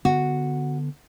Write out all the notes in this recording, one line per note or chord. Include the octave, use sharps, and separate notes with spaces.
D3 B3 F#4